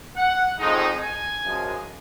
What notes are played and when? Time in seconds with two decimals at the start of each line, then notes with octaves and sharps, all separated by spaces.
0.17 F#5
0.59 F2 D#3 G#3 D#4
1.01 G#5
1.43 F#2 F3 G#3